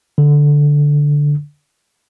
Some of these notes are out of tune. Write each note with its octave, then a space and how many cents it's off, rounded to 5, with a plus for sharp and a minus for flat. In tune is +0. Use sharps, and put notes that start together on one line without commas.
D3 -5